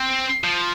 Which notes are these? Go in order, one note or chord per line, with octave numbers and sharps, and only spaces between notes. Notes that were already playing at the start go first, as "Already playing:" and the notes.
Already playing: C4
F3